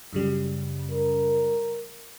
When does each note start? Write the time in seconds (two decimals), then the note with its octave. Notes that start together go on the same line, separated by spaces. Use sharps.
0.13 F#2 C#3 G3
0.92 A#4